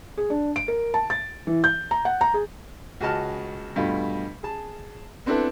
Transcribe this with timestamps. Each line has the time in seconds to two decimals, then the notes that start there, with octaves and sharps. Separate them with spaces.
0.17 G#4
0.30 D4
0.56 D7
0.68 A#4
0.94 A5
1.10 A6
1.47 E3
1.64 G6
1.91 A#5
2.05 F#5
2.21 A#5
2.34 G#4
3.01 C#2 F#4 G#4 D#5 A5 F6
3.76 G2 B2 A3 F4
4.43 G#4 A5
5.26 B3 C4 D4 E4 A4 B4